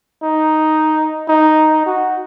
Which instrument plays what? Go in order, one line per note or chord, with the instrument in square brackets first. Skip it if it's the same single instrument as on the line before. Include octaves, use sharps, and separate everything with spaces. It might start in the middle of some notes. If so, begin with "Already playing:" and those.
[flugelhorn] D#4
D#4
F#4